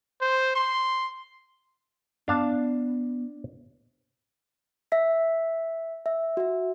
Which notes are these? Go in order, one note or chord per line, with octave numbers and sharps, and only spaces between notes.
C5
C6
B3 D4 F5 A5
E5 B6
E5
F#4 E5